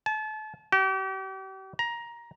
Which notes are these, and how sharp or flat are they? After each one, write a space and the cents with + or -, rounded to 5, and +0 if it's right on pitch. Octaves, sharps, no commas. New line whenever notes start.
A5 -35
G4 -40
A#5 +15